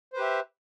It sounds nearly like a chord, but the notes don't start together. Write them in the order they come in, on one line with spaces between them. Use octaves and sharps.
C5 B4 G4 E5